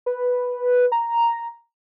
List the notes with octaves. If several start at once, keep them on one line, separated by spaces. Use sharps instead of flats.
B4
A#5